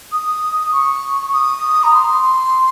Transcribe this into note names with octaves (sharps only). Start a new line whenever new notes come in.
D#6
C#6
D#6
A#5
C6